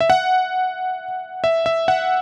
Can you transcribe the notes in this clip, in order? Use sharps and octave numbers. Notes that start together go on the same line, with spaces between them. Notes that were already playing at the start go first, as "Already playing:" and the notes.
E5
F#5
E5
E5
F#5